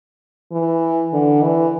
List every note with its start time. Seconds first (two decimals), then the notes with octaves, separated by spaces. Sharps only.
0.52 E3
1.13 D3
1.43 E3